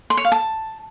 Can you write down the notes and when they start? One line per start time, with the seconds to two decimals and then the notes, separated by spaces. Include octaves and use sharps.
0.10 C6
0.17 C#5
0.25 F5
0.32 A5